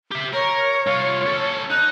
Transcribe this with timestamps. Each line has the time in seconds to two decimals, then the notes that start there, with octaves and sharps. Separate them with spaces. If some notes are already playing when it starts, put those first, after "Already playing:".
0.12 G4 E5
0.33 A#4 C#5
0.87 C2 F4
1.26 C#4 A4
1.70 D#4 F#6